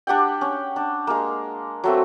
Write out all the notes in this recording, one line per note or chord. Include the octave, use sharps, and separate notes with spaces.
D4 G4 F#5 G5
C#4
D4
G#3 A#3
F#3 A3 C4